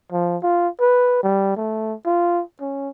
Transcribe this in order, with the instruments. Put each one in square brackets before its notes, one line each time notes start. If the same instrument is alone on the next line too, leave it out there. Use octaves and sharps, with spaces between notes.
[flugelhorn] F3
F4
B4
G3
A3
F4
C#4